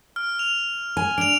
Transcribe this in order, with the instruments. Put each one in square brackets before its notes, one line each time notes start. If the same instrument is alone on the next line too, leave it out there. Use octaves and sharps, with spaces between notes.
[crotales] F6
F7
[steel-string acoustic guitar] G#5
[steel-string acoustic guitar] D4 [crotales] D7 F7